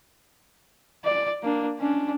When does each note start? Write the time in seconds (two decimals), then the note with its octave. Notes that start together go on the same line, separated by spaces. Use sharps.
1.04 D5
1.43 A#3 D4
1.79 C#4 D4